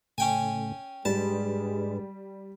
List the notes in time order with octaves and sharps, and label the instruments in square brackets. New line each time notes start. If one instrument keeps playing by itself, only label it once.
[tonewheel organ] A2 C#3 A3 [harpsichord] C#4 G5 G#5
[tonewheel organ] G#2 D4 B4 [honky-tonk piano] G3 [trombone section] G#3 [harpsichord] A5